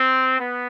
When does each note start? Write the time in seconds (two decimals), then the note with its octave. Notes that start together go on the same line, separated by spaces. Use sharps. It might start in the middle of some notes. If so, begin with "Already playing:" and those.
Already playing: C4
0.39 B3